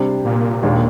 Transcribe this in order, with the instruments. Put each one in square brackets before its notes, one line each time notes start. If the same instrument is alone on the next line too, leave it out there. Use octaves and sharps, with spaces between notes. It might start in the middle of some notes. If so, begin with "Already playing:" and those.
Already playing: [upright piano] C3 G3 D4 G4 C5
[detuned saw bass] A#2
[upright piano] D#2 D#3 G#3 D4 G4